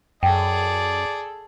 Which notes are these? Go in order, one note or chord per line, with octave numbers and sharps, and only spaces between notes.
F#2 G#4 A4 D5 G5